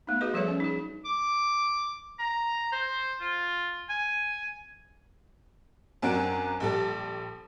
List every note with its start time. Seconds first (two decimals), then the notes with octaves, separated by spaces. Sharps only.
0.07 A3 B3 D#4
0.21 F#4 G#4 B4 D#5
0.34 F3 G3 G#4 A4 C#5 E5
0.48 C#4
0.60 D#4 G#4
1.05 D6
2.19 A#5
2.72 C5
3.21 F4
3.89 G#5
6.02 F#2 C4 D4 F#4 A#4 D7
6.60 A#1 G3 A4